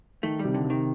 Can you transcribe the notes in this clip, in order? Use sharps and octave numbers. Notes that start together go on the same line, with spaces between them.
D#3 A3
G3
C3
D3
C3
D#3